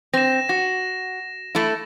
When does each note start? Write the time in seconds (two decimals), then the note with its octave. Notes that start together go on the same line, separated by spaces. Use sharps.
0.14 C4 A#6 E7
0.49 F#4 A#6
1.55 A3 E4